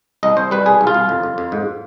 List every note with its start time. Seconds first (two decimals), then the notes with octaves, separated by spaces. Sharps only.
0.23 C2 D#5
0.37 C2 C5
0.51 G3 B4
0.66 C2 G#4
0.81 C2
0.87 F4
0.94 C2
1.09 F2
1.23 F2
1.38 F2
1.52 G#2